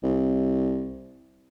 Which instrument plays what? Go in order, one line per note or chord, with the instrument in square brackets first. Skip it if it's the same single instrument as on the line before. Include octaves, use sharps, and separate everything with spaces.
[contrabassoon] C2